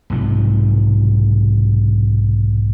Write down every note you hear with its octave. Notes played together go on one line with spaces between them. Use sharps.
B1 G#2 C3 F3